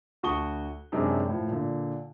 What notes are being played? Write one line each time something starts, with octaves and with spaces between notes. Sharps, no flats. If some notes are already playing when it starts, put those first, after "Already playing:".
D2 F#4 A5 C#6 D#6 G7
F#2 C3 G#3 D4 D#4
A2 F3
A#2 D3